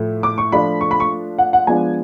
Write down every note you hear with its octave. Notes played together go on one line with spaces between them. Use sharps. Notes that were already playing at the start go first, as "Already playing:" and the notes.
Already playing: A2 F3 A3
D6
C#6
F3 A3 D4 F4 B5
C#6
B5
C#6
F#5
F#5
F3 G#3 B3 D4 F4 G#5